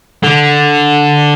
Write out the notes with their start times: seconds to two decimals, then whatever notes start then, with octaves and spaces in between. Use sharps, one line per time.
0.23 D3